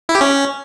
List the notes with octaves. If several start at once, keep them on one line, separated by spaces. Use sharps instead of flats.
E4
G4
C#4